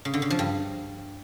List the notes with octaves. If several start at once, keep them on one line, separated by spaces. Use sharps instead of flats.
C#3
D3
C#3
F3
G2